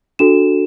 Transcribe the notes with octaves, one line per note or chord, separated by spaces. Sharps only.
D4 F#4 A4 E7